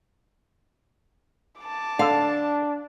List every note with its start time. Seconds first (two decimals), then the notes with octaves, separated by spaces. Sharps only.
1.60 A5 D6
1.99 D3 D4 A4 F5